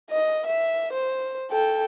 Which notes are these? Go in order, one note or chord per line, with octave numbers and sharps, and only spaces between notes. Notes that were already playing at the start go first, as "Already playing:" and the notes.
D#5
E5
C5
A4 G5